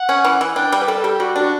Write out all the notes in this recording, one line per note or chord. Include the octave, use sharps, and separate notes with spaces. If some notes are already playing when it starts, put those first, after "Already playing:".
Already playing: F#5
C#4
E3
E3
D4 G5
G3 G5
B4
G3 A4
G3 G4
G3 F#4
D4
F#4